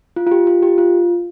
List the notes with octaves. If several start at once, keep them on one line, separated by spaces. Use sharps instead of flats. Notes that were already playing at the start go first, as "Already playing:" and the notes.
F4
F4
G4
F4
G4
F4